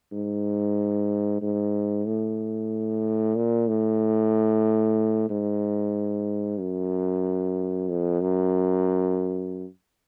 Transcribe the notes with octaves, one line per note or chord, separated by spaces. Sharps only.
G#2
G#2
A2
A#2
A2
G#2
F#2
F2
F#2